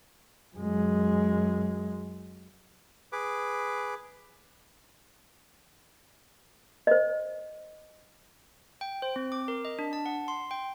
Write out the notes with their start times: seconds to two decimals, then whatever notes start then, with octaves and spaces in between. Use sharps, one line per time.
0.55 F#2 G#3
3.12 G#4 B4 D6
6.87 C5 D#5
8.81 G5
9.02 C5
9.16 C4
9.32 D6
9.48 A#4
9.65 D#5
9.79 D4
9.93 A5
10.06 F#5
10.28 C6
10.51 G5